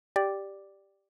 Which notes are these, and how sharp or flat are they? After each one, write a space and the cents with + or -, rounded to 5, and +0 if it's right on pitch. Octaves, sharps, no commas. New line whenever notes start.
G4 +0 D5 +0